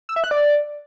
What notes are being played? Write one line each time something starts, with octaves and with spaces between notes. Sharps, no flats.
E6
E5
F#6
D5